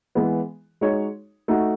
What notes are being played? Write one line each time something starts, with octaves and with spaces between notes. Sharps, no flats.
E3 G#3 B3
G#3 D#4 F#4 C#5
A3 D#4 F#4